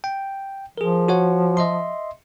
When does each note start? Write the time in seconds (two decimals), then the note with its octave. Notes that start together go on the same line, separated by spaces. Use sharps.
0.04 G5
0.78 F3 G#4 A#4
1.08 F#4 C#5 F#5
1.57 D#5 E5 C6